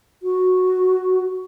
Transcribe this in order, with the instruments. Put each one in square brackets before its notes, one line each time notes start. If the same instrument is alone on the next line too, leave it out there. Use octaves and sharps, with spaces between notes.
[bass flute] F#4